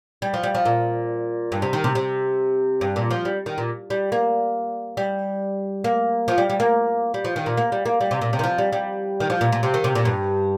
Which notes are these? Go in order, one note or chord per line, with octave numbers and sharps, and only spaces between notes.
G3
F3
G3
F3
A#2
G2
C3
D#3
C3
C3
G2
A#2
F3
G3
D#3
A#2
G3
A#3
G3
A#3
F3
G3
G3
A#3
G3
F3
D#3
A#2
A#3
G3
A#3
G3
C3
A#2
C3
D#3
F3
G3
G3
D#3
F3
A#2
A#2
C3
D#3
C3
A#2
G2